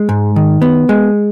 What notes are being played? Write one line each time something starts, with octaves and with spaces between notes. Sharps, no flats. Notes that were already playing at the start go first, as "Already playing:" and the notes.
Already playing: G#3
G#2
D#3
B3
G#3